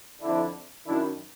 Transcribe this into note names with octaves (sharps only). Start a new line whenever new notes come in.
F2 D3 D4 E4
F#2 D#3 D4 E4